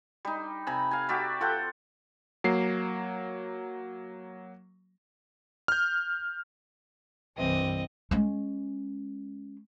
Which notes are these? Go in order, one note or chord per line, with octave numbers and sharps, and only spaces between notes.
G3 D#4
C3 G#5 A#5 B5
F5 G#5
F#4 G4 D5 E5
F4 A4 F#5 G5
F#3 A#3 C7
F6 G6
C2 G2 E3 C4 D#5
G#3 C#4